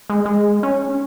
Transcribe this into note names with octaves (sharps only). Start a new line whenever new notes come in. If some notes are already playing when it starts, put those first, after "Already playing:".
G#3
G#3
C#4